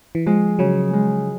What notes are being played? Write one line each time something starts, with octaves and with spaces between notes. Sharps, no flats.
E3
F3 G#3
C#3 F#3
G#3